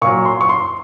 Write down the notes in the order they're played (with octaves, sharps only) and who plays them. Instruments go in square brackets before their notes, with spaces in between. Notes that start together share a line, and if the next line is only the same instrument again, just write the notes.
[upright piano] A#2 F#3 C#6
C6
C#6
C6